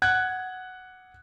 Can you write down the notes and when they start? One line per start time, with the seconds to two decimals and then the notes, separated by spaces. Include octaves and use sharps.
0.02 F#5 F#6 G#6